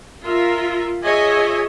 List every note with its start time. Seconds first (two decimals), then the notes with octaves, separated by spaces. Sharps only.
0.24 F4 A#4 E5
1.02 F4 G#4 C#5 D#5 E5 G#5